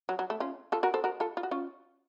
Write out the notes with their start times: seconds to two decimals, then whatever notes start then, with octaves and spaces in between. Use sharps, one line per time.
0.09 F#3
0.19 F#3
0.30 A3
0.40 C#4 F4
0.72 F4 A4
0.83 F#4 A#4
0.94 A4 C5
1.04 F#4 A#4
1.20 F4 A4
1.37 F4
1.43 F#4
1.51 C#4 F4